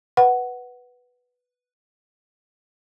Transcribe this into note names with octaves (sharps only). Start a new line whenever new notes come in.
B4 F#5